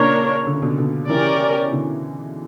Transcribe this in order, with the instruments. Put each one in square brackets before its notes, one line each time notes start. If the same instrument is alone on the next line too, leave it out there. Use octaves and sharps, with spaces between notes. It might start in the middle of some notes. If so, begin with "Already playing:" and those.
Already playing: [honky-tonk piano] A#2 C#3 [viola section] A#3 D4 A#4 C#5
[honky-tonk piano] D3
C#3
B2 D3
B2 D3
[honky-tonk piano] C#3 E3 [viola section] C#4 G4 A#4 D5
[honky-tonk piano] B2 D3